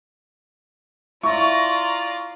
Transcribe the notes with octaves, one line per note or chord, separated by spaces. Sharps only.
E4 F4 D5 A#5 C#6